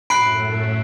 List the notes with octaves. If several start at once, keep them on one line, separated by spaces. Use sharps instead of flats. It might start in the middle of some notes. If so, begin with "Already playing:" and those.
F#2 A2 A3 B5 F#6 C7 D7